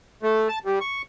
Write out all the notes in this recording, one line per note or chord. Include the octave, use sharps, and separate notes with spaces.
A3
A5
G3
C#6